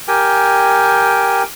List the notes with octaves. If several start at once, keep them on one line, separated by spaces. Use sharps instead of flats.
G4 A#4 G5 G#5